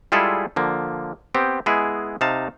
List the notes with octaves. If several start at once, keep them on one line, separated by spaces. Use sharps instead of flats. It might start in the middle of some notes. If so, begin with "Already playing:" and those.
G3 G#3 E4 F4 G#4 A4
D3 F3 A#3
B3 C4 G4
G#3 B3 E4 G#4
C3 D#4 F5 A5